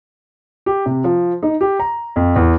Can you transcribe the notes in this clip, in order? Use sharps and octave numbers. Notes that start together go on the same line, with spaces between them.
G4
C3
F3
D#4
G4
A#5
F2
E2